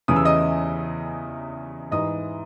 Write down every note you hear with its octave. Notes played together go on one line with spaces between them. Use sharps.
E2 C#3 E3 D#6
E6
D#5 D#6
G#2 E3 D#5 D#6